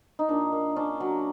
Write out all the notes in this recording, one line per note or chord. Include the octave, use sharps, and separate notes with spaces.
D#4
A#2 D4
A#3
C#4 D4
F#3